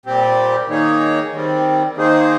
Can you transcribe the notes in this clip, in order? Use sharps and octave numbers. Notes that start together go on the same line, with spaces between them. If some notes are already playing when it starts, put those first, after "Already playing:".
A#2 G3 C4 G4
D#3 A#3 D#4 G#4 C#5
D#3 G3 C4
D#3 A#3 D#4 G#4 C5